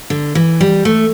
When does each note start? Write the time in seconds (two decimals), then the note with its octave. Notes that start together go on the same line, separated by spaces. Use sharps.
0.10 D3
0.35 E3
0.61 G3
0.85 A3